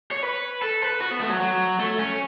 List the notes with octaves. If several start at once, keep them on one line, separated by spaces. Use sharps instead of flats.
C#5
B4
A4
B4
F#4
B3
A3
F#3
F#3
A3
C#4